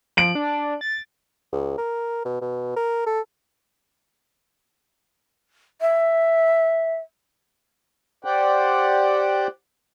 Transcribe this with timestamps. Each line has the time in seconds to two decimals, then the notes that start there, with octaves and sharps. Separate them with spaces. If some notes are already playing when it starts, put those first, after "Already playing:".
0.17 F3 D7 F#7
0.35 D4
0.81 A6
1.52 C#2
1.77 A#4
2.25 B2
2.41 B2
2.77 A#4
3.06 A4
5.81 E5
8.25 G4 C5 D5 F#5 G5